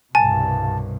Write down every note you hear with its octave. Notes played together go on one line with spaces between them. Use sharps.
C2 G2 B2 G#5 A5